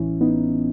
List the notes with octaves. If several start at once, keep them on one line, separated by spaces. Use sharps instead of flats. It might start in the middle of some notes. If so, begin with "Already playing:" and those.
Already playing: A1 A2 E3 C#4 E4
B3 D#4